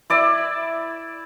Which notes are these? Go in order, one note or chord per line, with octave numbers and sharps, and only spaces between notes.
E4 D5 E5